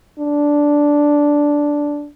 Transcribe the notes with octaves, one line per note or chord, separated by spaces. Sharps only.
D4